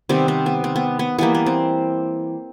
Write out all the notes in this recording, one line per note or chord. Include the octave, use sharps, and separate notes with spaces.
C3 D#3 G3 B3 C4
C4
B3
C4
B3
B3
E3 G3 A#3 B3
B3
C4